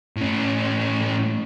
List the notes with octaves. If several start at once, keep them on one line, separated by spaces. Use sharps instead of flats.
A2 C#4